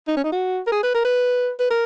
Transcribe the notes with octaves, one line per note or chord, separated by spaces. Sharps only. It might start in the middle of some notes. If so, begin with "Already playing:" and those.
D#4
C#4
D#4
F#4
A#4
G#4
B4
A#4
B4
B4
A#4